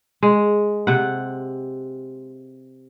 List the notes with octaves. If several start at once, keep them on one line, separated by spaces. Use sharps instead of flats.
G#3
C3 F#5